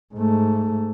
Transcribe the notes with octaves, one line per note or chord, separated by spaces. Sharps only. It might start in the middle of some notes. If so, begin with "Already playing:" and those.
G#2 A3